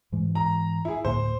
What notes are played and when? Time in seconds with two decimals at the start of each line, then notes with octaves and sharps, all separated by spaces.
0.12 G#2 E3 G#3
0.35 A#5
0.85 E4 G#4
1.05 D2 A2 A#3 C5